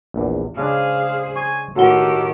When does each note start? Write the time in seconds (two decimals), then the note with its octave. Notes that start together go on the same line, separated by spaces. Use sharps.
0.14 A#1 E2
0.57 C#3 G#3 D4 G#4 C5 F5
1.36 G#5 C#6
1.76 A2 D#3 F#4 G4 A4 F#5 G7